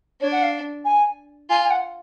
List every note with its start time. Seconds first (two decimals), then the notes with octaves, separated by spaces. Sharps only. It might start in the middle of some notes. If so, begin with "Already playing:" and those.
0.21 D4 C#5
0.32 F#5
0.43 F5
0.85 G#5
1.50 F4 G#5
1.64 G#5
1.70 F#5